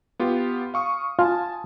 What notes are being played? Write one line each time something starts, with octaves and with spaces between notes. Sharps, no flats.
B3 F4 G4
F5 C#6 D#6
F4 G#5 A5